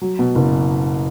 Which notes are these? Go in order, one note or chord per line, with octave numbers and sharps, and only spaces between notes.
F#3
B2
F#1